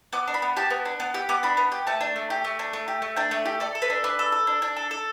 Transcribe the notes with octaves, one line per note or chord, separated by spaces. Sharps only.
B3 D6
D4
B5
B3
G4 A5
B3
D4
B3
G4
B3 D6
D4 B5
B3
G4
A3 A5
D4
A3
G4
A3
D4
A3
G4
A3
D4 G5
A3
G4
A4 D5
A4
B4
D4
D4 B4
A4
A4
D4
D4
A4
A4